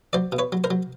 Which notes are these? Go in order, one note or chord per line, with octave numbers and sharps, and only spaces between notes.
F#3 C5 D5
B2
B4 C#5
F#3
A#4 C5
F#3